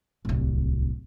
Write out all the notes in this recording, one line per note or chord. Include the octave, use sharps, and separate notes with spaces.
D1 C2